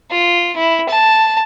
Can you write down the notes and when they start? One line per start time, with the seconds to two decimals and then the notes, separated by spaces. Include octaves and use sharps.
0.11 F4
0.56 E4
0.89 A5